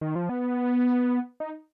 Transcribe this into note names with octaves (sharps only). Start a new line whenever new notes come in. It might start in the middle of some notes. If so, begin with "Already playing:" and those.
D#3
F3
B3
D#4